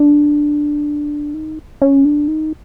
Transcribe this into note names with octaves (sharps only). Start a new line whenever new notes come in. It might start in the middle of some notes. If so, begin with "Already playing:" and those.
Already playing: D4
D#4
C#4
D4
D#4